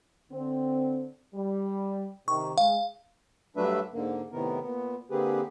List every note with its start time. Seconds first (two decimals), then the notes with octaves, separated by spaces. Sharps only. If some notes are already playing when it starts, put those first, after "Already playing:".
0.32 D3 C4
1.34 G3
2.28 C3 D#3 C#6
2.58 G#3 F5
3.56 G2 F#3 A3 D4 B4 E5
3.93 G#2 D3 A#3
4.32 A2 C3 D#3 B3 A#4
4.62 A#2 B3
5.11 D3 A#3 C4 G4 G#4 B4